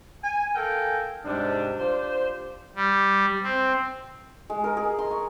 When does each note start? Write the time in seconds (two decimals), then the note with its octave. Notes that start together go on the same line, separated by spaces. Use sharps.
0.24 G#5
0.55 A4 A#4 F5 G5 G#5
1.25 G#2 C3 G3 D4
1.80 D4 F4 G4 C5
2.75 G3
3.43 C4
4.50 G#3
4.64 A#4
4.77 G#4
4.99 C6
5.11 C#6